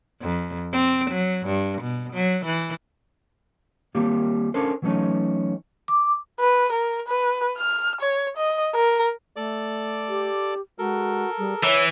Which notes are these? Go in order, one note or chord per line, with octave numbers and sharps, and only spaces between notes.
F2
C4
F#3
G2
B2
F#3
E3
D#3 G3 A#3 C4 G4
C#4 D4 A4 A#4 C5
E3 F#3 G3 A3 C#4 D#4
D6
B4
A#4
B4
F6
C#5
D#5
A#4
A3 A4 D5 D6
G4
G#3 F#4 A4 A#4
G3 G#4
E3 C#5 E5